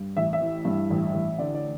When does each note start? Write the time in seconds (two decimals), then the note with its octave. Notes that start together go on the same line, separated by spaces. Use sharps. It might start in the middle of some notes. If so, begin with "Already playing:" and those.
Already playing: G2
0.16 A1 E5
0.33 E5
0.41 E3
0.65 G2
0.90 A1
1.14 A1
1.38 D3 D5
1.55 D5